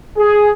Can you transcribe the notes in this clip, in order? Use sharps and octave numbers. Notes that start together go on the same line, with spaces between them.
G#4